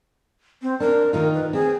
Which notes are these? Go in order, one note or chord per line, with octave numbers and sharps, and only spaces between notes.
C4
D4 A#4
D#3 D#4 F4 A#4
B4
C4 G#4